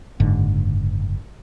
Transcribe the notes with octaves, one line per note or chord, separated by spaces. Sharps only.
F#1 G#2 D3